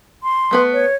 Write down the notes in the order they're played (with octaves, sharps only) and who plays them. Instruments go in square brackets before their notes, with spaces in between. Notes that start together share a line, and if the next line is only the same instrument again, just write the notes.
[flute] C6
[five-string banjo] A3 B3 B4
[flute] C#5